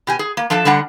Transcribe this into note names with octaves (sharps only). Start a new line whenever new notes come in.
B2 G4 G#5
G#4
A#3
F3 D4 A4 E5
D3 G3 D4 F#5